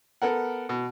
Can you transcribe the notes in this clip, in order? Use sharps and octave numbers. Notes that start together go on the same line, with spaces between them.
B3 A4 A#4 F#5
B2